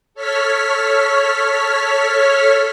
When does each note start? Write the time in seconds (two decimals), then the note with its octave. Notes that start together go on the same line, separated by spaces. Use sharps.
0.14 A4 C#5 F6 B6